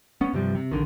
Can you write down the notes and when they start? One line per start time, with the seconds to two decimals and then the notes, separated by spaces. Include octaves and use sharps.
0.21 B3 C#4
0.33 G2 C3 F3 G3
0.55 C3
0.71 A#1 D3 D#3